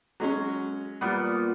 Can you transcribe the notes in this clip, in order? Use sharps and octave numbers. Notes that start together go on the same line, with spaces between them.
F#3 G#3 C#4
A#2 G3 B3 B5